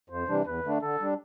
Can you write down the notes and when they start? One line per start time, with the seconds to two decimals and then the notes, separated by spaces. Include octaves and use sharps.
0.10 F2 C5
0.28 C3 E3 G3 D4
0.46 E2 B4
0.64 D3 A3 D4
0.82 D3 A4
1.00 G3 D4